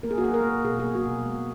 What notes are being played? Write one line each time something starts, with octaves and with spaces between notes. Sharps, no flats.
A#3 A#4
G#4
F#4
A#3 G#4
A#4
A#3
B2 G#4
A#3 G#4
F#4
B2
G#3